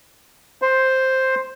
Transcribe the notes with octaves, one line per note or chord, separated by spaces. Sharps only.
C5